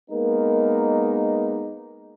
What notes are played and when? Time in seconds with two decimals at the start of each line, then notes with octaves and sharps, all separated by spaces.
0.11 G#3 A#3 B3 D#4 A#4